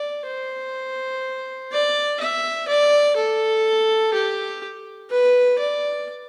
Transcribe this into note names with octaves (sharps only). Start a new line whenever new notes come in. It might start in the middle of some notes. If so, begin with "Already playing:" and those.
Already playing: D5
C5
D5
E5
D5
A4
G4
B4
D5